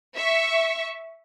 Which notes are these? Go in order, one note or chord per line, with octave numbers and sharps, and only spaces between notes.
E5 C#6